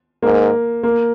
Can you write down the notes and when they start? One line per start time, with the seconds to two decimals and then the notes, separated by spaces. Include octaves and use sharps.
0.23 G#2 A#3
0.83 A#3